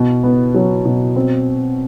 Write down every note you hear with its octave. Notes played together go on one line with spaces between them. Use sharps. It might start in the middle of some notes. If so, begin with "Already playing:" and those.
Already playing: B2
B3
F#3
B2
C4